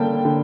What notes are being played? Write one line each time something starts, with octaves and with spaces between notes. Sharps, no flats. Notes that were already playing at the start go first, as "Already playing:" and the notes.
Already playing: D3 G3 A#3 G5 A5
D3